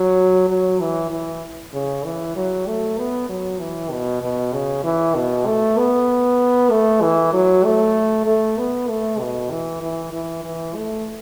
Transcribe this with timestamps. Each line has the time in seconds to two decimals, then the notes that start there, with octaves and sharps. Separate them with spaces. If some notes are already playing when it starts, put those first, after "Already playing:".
Already playing: F#3
0.49 F#3
0.80 E3
1.11 E3
1.73 C#3
2.05 E3
2.36 F#3
2.67 A3
2.98 B3
3.29 F#3
3.60 E3
3.91 B2
4.22 B2
4.53 C#3
4.84 E3
5.15 B2
5.46 A3
5.78 B3
6.71 A3
7.02 E3
7.33 F#3
7.64 A3
8.26 A3
8.58 B3
8.89 A3
9.20 B2
9.50 E3
9.82 E3
10.13 E3
10.44 E3
10.76 A3